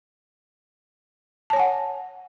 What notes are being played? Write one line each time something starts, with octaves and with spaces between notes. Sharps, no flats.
C#5 F#5 G#5 A5